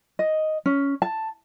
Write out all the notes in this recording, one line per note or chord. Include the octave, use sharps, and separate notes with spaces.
D#5
C#4
A5